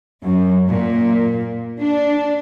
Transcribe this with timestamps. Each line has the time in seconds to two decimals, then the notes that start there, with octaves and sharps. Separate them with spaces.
0.22 F#2
0.69 A#2
1.80 D4